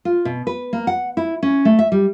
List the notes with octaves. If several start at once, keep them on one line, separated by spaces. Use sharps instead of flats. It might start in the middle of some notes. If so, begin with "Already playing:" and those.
F4
B2
B4
A#3
F#5
E4
C#4
A3
E5
G3